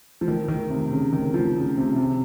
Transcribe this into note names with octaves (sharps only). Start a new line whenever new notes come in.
F3
D#3
D#3
C3
C#3
D#3
F3
C#3
C3
C#3
C3